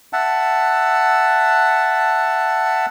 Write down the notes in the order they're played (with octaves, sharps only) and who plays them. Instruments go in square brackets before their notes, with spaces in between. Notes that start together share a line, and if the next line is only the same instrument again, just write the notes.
[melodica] E5 F#5 A5